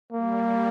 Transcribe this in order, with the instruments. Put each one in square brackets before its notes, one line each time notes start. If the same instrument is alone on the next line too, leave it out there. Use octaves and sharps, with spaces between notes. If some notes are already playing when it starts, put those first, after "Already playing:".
[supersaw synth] G3 [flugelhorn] A#3